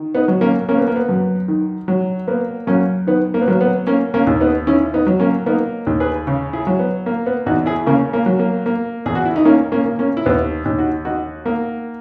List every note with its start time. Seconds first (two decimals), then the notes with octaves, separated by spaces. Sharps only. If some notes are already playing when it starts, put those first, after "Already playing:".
Already playing: D#3
0.15 B3 D#4
0.28 F#3
0.41 A#3 C#4
0.69 A#3 C#4
0.77 B3
0.88 A#3
0.96 B3
1.09 F#2
1.48 D#3
1.88 F#3
2.28 A#3 B3
2.67 F#2 A#3 C#4
3.07 D#3 B3
3.34 A#3
3.41 B3
3.48 F#3 A#3
3.61 B3
3.87 A#3 C#4
4.14 A#3 C#4
4.27 D#2
4.40 B3 D#4
4.67 D#3 C#4 E4
4.94 B3 D#4
5.07 F#3
5.20 A#3 C#4
5.46 A#3 B3 D#4
5.87 D#2
6.00 G#4 B4
6.27 C#3
6.53 E4 G#4
6.67 F#3
6.79 B3
7.06 A#3
7.26 B3
7.46 E2 D#4 F#4
7.66 E4 G#4
7.86 C#3 A#3 C#4
8.13 A#3
8.26 F#3
8.39 A#3
8.66 A#3
9.06 E2 G#4
9.15 F#4
9.25 E4
9.36 D#4
9.45 D#3 A#3 C#4
9.72 A#3 C#4
9.86 A#3
9.99 A#3 C#4
10.17 E4
10.26 D#2 B3 D#4
10.65 D#2
10.78 D#4 F#4
11.05 D#3 D#4 F#4
11.46 A#3